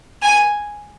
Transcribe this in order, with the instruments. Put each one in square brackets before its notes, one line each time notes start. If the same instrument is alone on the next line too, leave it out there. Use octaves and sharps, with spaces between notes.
[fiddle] G#5